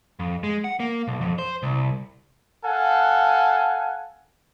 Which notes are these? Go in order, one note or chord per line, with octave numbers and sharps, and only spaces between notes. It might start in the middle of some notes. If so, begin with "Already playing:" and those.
F2
G#3
F#5
A#3
B1
F2
C5
C2
A4 F5 F#5 G#5